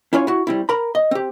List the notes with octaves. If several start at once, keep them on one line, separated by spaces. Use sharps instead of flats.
C#4 E4 F4 C#5 G#5
E4 F#4
G3 C4 E4
A#4 A#5 B5
D#5
C4 G4